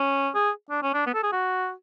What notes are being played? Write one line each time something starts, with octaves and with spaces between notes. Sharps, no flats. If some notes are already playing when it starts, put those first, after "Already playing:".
Already playing: C#4
G#4
D4
C#4
D4
B3
A4
G#4
F#4